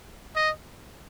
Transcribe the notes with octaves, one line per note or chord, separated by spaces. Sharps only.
D#5